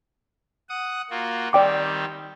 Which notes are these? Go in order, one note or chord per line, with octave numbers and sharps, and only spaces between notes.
F#5 D#6
A#3 F4 F#4
D#3 G3 C4 D5 G5 D6